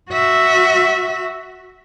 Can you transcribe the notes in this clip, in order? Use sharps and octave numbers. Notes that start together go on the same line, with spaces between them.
F#4 E5